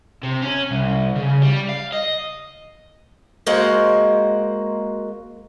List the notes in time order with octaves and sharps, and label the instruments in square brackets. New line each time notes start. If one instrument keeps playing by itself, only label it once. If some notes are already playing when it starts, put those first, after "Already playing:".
[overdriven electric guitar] C3
C#4
C2
C#3
G3
F5
D#5
[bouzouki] G#3 A#3 F#4 C5